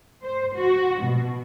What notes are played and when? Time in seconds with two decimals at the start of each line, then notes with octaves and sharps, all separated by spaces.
0.22 C5
0.55 F#4
1.01 B2